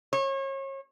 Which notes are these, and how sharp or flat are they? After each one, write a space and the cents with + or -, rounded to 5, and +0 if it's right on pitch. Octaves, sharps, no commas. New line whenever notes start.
C#5 -35